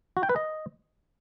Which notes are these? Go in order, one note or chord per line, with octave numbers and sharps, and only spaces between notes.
F#4
G5
B4
D#5